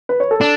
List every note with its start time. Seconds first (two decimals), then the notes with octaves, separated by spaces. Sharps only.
0.09 B4
0.20 C#5
0.31 A4
0.41 D4